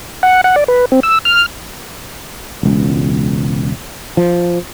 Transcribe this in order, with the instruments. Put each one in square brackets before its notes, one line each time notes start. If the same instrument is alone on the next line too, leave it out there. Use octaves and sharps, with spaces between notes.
[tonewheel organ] F#5
F#5
D5
B4
C4
E6
F6
[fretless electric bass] E1 C#2
F3